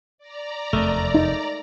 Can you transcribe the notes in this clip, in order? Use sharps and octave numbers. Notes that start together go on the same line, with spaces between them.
D5 A#5
F1 E2 C3 A3 A#4 D#5
D#4